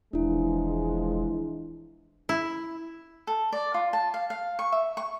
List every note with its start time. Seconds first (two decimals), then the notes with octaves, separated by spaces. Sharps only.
0.13 E1 E3 F3 G#3 D4 E4
2.29 E4
3.27 A4
3.53 D5
3.74 F4
3.93 A5
4.14 F5
4.30 F5
4.59 C#6
4.72 E5
4.97 C#6